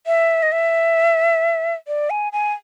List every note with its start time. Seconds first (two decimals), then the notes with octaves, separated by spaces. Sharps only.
0.07 E5
0.43 D#5
0.52 E5
1.88 D5
2.10 G#5
2.33 G#5